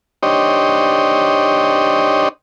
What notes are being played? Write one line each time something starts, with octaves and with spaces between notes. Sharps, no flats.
D4 D#4 G4 C5 C#5 D#5